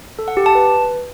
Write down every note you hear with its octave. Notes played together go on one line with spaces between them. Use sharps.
A4
F#5
G4
A5
B4